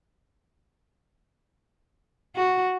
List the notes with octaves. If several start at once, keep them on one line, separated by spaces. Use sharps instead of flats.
F#4